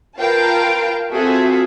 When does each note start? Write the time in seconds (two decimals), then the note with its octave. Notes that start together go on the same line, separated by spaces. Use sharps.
0.18 F4 A#4 B4 F5 G5 A5
1.12 C4 F4 F#4 G#4 A4 E5